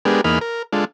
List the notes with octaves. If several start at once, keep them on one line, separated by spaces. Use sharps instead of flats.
G#3 B3 D4 G4 G#4 A#4
E2 A#3 D#4 G#4 B5 F6
A#4
G#3 D4 F4 A4